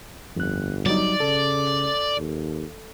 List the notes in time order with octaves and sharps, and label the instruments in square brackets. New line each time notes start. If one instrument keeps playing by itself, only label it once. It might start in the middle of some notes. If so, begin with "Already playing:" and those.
[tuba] G1 [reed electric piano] F2 F#6
[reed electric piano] F#3 G3 D#4 [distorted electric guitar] D5
[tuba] C#3 [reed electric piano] A4
[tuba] D#2